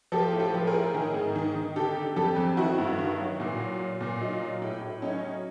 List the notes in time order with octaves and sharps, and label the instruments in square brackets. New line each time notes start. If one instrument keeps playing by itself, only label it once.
[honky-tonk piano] F3 G4 A4
A2
G4 A4
F3
G#4 A#4
A2
D#3
G#2
D#3
D#3
D3 G4 A4
D3
F2 G4 A4
F2
D#3 E4 F#4
G2
D#3
F#3
A#2
F#3
F#3
A#2
F#3 D#4 F4
F#3
A2
A2
F#3 C#4 D#4
F#3